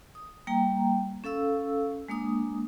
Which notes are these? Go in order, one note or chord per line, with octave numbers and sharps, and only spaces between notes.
D#6
G3 A#3 G5 A#5
C#4 A4 F5 E6
G#3 A#3 D4 D#6